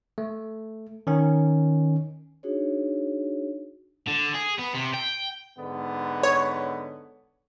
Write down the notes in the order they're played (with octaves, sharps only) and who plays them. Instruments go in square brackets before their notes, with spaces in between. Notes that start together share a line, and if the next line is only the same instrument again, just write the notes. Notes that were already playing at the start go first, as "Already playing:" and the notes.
[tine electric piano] A3
D#3 C#4
[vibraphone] D4 D#4 F#4 G#4 C#5
[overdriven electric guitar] D3
G#4
B3
C3
G5
[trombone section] G#2 D3 B3
[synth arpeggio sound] C#5